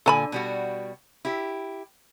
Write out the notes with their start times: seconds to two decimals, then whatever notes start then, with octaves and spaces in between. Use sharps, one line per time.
0.06 A#2 D3 A4 G#5 A5 B5
0.32 B2 G3 F#4
1.25 E4 G4